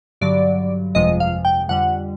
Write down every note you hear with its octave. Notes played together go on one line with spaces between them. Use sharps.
G2 D3 F#3 D5
G1 F2 C3 F3 G#3 D#5
F5
G5
F2 D3 G3 F#5